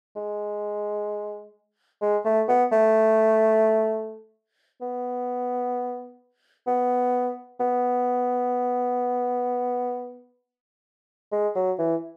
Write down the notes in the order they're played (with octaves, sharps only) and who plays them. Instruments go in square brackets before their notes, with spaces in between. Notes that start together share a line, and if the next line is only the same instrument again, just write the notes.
[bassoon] G#3
G#3
A3
B3
A3
B3
B3
B3
G#3
F#3
E3